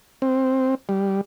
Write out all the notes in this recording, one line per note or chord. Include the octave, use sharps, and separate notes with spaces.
C4
G3